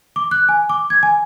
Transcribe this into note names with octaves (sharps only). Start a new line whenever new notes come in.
D6
F#6
G#5
D6
G#6
G#5